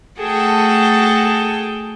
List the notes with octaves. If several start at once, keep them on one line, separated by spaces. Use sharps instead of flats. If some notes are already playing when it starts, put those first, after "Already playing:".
A3 F#4 G#4 A4 G5 A5